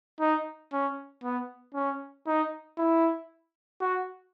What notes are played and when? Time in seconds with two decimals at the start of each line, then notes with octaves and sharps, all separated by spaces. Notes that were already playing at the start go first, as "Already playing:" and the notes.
0.20 D#4
0.72 C#4
1.23 B3
1.75 C#4
2.27 D#4
2.78 E4
3.81 F#4